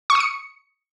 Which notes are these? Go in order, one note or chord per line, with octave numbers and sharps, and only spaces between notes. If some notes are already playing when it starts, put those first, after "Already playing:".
C#6
D#6
C#7